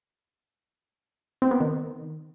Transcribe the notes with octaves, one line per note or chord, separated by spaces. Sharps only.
C4
B3
D#3